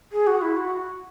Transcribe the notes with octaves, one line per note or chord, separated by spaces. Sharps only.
G#4
F#4
E4
F#4